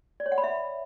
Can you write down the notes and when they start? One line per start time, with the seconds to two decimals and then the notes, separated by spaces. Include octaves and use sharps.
0.20 D5
0.26 C#5
0.32 F#5
0.38 B5
0.44 E5